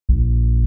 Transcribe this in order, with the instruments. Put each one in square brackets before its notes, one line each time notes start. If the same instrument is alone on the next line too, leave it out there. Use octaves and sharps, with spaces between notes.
[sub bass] A#1